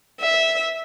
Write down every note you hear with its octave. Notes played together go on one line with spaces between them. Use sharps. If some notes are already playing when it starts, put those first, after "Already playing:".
E5